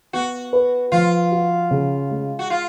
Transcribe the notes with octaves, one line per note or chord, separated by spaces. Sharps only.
B3 F#4
B4
F3 F4
F#4
C#3
G#3
F#4
F4